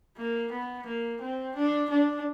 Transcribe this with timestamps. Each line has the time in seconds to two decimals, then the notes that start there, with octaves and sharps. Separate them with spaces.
0.17 A#3
0.51 B3
0.86 A#3
1.21 C4
1.56 D4
1.90 D4